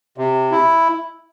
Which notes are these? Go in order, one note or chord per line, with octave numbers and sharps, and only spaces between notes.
C3
E4